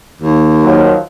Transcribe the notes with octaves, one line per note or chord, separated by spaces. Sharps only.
D#2
D#3 F3 F#3